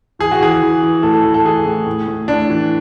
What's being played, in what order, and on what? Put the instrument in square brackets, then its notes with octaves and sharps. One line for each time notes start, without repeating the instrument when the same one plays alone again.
[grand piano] E3 G#4
F#4
E3 G#4
E3
E3
A2 A4
A4
E3
A4
E3 G#4
A2
A2
A2
A2 D4
E3